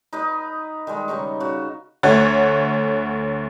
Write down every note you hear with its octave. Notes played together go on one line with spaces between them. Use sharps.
D#4 B4 D#5 B5
D#3 G3 G#3
C#3 G3 D#4 C#6
C#3 F#4
D2 A3 C#5 F#5 G#6 A6